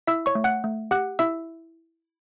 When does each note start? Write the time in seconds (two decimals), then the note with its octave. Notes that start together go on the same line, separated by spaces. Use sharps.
0.07 E4 E5 E6
0.26 C#5 C#6
0.35 A3
0.44 F#5 F#6
0.64 A3
0.91 G4 F#5 F#6
1.19 E4 E5 E6